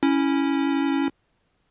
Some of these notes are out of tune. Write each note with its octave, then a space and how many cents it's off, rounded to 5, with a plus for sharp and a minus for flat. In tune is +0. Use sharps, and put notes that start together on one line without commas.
C#4 +0 E4 -5